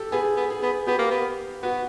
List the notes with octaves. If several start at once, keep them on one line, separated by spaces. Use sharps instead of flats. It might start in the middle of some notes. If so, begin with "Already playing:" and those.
Already playing: G4 A4
B3 G#4
B3
G#4
B3
B3 G4
A#3
B3
B3 F#4